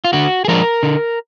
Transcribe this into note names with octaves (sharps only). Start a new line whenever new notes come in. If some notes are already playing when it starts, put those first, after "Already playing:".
F4
D3 F#4
G#4
F3 G#3 D4 A#4
D3